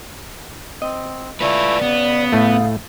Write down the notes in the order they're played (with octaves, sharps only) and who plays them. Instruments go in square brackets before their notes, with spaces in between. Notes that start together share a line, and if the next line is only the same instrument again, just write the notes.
[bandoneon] C4 [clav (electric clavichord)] D#5
[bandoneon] A3 E4 [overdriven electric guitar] F4 B4 [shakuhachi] D5
[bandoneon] C#3 [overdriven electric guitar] B3
[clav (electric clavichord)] A2 A3 [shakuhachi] F5